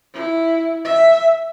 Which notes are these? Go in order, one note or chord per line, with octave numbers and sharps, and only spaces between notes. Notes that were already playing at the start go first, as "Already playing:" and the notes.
E4
E5